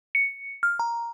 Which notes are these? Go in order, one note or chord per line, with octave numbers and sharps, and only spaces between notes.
C#7
F6
A#5